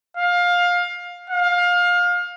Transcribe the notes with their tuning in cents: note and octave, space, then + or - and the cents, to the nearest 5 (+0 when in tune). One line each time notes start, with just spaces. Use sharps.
F5 +20
F5 +25